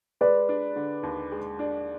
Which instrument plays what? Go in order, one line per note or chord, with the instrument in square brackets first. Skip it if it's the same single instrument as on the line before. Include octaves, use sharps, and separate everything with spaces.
[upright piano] G#3 [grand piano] B4 D5
[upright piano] D4
D3
D#2
G#3
D4